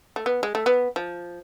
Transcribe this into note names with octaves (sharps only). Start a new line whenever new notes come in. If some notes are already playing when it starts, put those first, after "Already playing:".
A3
B3
G#3
A3
B3
F3